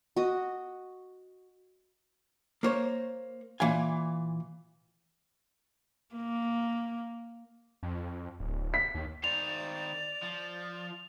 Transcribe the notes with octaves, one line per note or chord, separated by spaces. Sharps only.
F#4 D#5
A#3 C5 C#5
A#2 E3 F5 G#5
A#3
F2
D1
B6
D#2
D#3 C5 D5 F7
F3